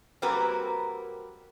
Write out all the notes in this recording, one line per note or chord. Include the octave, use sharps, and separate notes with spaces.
G3 A#3 C4 F#4 A#4 B4